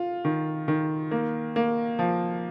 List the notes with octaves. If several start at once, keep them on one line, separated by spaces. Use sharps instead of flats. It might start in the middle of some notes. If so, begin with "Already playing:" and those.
Already playing: F4
D#3
D#3
A#3
A#3
F3